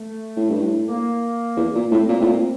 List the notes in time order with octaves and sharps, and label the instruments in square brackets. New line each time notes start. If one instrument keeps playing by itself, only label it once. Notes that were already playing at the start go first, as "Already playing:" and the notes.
Already playing: [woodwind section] A3
[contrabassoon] A2
G2
A2
[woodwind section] A#3
[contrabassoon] E2
A#2
[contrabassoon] A2 [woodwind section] C4
[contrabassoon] A#2
A2
A#2